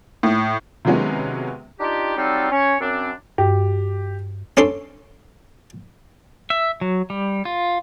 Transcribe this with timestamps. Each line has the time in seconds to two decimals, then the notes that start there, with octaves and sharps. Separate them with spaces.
0.23 A2
0.85 C3 D#3 F#3 G#3 B3 C#4
1.80 D4 D#4 F4 G4
2.17 F#3 G3 C4 D#4 F4 A4
2.52 C#4 C#5
2.81 F#2 C4 D4
3.38 G2 G4
4.57 C#4 D4 A4 C6
6.50 E5
6.81 F#3
7.10 G3
7.45 F4